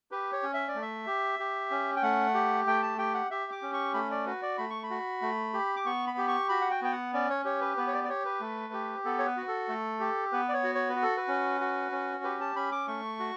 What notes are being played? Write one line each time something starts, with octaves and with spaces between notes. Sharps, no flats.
G4 B4
C#5
C#4
E5
D5
A3
E5
G4
G4
C#4
G5
A3 F#5
G4
A3 G5
A5
G4 G5
F#5
G4 E5
D6
C#4
C#6
A3 B5
D5
F#4 B4
D5
A3 B5
C#6
B5
F#4
A3
G4
D6
B3 C#6
B5
G4
C#6
F#4 B5
F#5
G5
B3 G5
F#5
C#4 D5
C#5
G4 C#5
B4
B3 B4
C#5
D5
D5
G4 C#5
B4
A3
G4
B3 A4
C#5
B4
F#4
A4
A3
G4
B3 B4
D5
C#5
F#4
C#5
B4
F#4
A4
B4
C#4
F#4
C#4
G4 B4
A5
C#4 B5
D6
A3 C#6
F#4